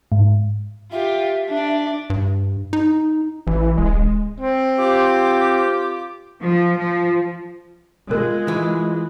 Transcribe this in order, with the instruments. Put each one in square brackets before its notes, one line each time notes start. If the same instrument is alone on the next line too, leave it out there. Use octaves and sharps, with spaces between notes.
[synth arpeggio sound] G#2
[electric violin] F4 G4 [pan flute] E5
[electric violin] D4 D5
[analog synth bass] G2
D#4
[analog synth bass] A1 [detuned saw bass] E3
[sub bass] D1 [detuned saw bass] G#3
[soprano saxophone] C4
[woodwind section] F4 G4 D6
[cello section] F3
F3
[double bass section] G#3 [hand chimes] F4 F#6 [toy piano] A#4
[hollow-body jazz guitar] E3